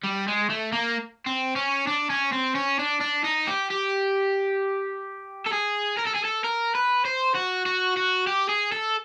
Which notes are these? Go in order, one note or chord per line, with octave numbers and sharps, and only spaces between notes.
G3
G#3
A3
A#3
C4
C#4
D4
C#4
C4
C#4
D4
D4
D#4
G4
G4
A4
G#4
A#4
A4
G#4
A4
A#4
B4
C5
F#4
F#4
F#4
G4
G#4
A4